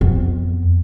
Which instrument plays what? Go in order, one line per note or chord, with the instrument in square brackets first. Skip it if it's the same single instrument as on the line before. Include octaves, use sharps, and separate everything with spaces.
[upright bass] F2 B3